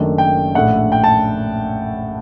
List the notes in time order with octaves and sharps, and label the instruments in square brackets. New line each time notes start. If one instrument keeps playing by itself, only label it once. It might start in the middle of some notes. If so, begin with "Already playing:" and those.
Already playing: [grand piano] F#1 F#2 D#3 A3 D4
G5
A#1 A2 A3 D4 F#5
G5
A5